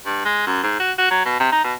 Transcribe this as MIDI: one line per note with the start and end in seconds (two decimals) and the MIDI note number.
0.06 0.22 43
0.25 0.46 56
0.47 0.63 42
0.63 0.78 44
0.79 0.92 66
0.98 1.06 66
1.11 1.23 54
1.25 1.36 47
1.40 1.47 48
1.52 1.63 63
1.64 1.74 47